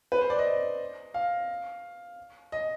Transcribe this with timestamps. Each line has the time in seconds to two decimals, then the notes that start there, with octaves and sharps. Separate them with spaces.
0.12 B4
0.21 C5
0.30 D5
0.39 D#5
1.14 F5
2.52 D#5